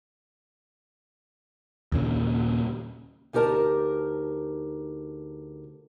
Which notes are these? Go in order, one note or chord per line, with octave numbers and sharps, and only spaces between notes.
D#2 A#2 C#3
D2 D#4 G4 A#4 A5